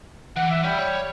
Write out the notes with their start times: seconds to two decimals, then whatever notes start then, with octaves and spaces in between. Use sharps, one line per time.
0.37 E3 F#5
0.51 E5
0.64 G3 C#4 B5
0.79 C#5